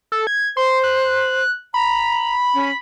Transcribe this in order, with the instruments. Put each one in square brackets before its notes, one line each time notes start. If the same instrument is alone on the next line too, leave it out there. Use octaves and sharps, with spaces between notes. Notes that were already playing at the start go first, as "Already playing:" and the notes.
[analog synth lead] A4
G#6
[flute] C5 [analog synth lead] C6
[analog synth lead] F#6
[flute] A#5 [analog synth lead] B5
[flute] C#4